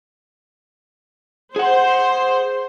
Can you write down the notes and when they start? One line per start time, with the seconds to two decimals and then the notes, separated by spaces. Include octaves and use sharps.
1.56 G#4 C5 F#5